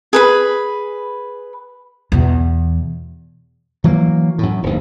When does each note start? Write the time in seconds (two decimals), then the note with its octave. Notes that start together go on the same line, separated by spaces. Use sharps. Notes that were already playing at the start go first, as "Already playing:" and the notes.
0.13 G#4 B4 B5
2.12 E2 B2
3.84 E3 F#3 G#3 A#3
4.38 F#2 A2
4.63 D1 D#2